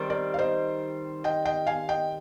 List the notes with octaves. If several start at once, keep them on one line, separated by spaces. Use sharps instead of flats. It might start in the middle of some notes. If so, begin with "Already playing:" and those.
Already playing: D#3 G3 C4
A#4 D5
F5
C5 D#5
D#5 G5
D#5 G5
F5 G#5
D#5 G5